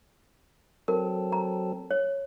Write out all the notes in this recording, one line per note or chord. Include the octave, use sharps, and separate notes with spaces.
F#3 C4 A4 A#4
A#5
C#5